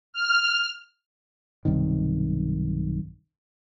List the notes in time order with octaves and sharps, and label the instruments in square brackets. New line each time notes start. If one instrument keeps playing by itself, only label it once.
[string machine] F6
[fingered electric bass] B1 G2 C3 D#3